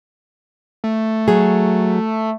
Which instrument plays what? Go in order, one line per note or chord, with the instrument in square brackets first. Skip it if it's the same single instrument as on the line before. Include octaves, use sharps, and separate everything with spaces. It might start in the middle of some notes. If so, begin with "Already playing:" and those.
[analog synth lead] A3
[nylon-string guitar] F#3 G#4